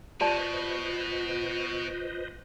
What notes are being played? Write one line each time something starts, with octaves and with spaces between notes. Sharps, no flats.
B2 F4 G4 B4 C5 D5 D#5 A5